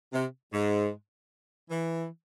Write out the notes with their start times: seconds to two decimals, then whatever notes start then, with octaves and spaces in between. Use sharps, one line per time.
0.13 C3
0.52 G#2
1.70 E3